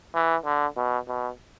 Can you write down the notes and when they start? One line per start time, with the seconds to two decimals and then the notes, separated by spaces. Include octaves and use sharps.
0.14 E3
0.44 D3
0.76 B2
1.08 B2